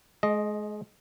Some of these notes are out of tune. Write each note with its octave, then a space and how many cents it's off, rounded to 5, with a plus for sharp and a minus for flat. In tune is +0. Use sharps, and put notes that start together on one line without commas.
G#3 +30 D#5 +0